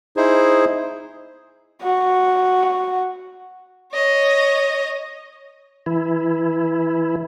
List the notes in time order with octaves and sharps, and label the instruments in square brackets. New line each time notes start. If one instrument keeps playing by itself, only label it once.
[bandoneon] D#4 E4 G#4 C5
[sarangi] F#4
[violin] C#5 D#5
[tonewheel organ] E3 E4